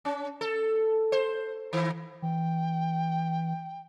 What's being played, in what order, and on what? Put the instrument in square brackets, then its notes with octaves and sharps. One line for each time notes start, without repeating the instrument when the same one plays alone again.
[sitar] C#4
A4
C5
D#3
[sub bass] E3 [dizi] G5